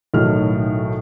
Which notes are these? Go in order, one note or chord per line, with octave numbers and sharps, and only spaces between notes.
B1 A2 D#3 F#3 F6